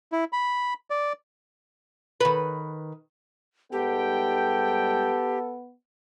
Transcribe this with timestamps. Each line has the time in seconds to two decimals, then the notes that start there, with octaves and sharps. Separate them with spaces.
0.12 E4
0.33 B5
0.90 D5
2.21 D#3 B4
3.72 G#2 G3 B3 G4 A4 G5